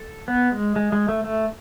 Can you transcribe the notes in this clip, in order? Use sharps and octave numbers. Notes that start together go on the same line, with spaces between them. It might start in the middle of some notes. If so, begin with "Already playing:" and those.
Already playing: A4
B3
G#3
G#3
G#3
A3
A3